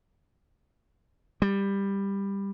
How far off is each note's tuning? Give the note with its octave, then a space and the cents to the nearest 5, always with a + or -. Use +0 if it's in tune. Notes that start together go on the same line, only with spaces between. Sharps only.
G3 +15